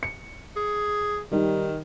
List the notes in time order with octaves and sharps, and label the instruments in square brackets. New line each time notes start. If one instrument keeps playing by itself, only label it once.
[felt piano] C#7
[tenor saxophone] G#4
[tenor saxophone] D#3 [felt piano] G3 D#4